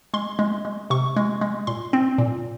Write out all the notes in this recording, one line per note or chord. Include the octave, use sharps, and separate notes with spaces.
G#3 C6
G#3
G#3
C3 C#6
G#3
G#3
A#2 C6
C4
A#2